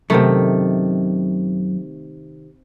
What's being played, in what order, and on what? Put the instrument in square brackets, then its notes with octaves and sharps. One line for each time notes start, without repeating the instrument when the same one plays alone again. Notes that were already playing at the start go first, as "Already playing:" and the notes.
[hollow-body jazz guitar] F#2 [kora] C3 D#3 A3